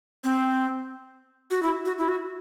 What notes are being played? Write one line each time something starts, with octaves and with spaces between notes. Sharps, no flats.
C4
F#4
E4
F#4
E4
F#4